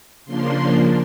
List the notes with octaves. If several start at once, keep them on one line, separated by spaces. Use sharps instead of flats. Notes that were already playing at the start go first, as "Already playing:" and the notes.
C#3 F3 A#3 D4 C6